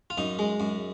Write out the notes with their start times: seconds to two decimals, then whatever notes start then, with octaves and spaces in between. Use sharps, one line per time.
0.10 F4
0.18 F#2 D#4
0.39 G#3
0.60 F#2